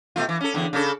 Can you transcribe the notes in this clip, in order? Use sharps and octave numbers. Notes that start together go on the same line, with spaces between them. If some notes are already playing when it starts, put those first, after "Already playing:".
B2 A3 F4
E3
C#4 A4
E2 D3
C#3 D4 A4